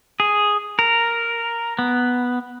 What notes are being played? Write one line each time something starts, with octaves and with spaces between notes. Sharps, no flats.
G#4
A#4
B3